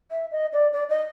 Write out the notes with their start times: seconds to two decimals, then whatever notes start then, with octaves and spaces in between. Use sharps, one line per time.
0.11 E5
0.32 D#5
0.53 D5
0.73 D5
0.89 D#5